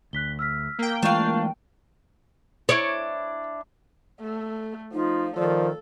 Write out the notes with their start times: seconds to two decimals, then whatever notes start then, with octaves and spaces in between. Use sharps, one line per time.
0.13 D2 F#6 B6 G7
0.39 E6 F6 B6
0.79 A#3 G5
1.03 E3 G#3 A3 D4 F4 F5 C#6 D#7
2.69 D4 E4 C#5
4.20 A3
4.93 F3 D#4 F4
5.37 D#3 F3 A4 D5